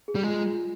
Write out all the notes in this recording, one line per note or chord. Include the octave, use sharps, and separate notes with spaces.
G#4
G3
G#3 F4
F4
F4